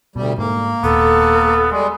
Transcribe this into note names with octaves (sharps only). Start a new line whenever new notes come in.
D2 B2 G3
G#2 A#3
D#1 B3 A4
G3 G#3